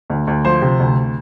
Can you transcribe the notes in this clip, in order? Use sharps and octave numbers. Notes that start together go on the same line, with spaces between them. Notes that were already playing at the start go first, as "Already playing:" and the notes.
D2
D2
F3 C5
C3
D2